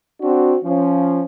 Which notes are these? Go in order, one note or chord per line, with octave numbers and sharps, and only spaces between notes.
C4 D4 F#4
F3 C#4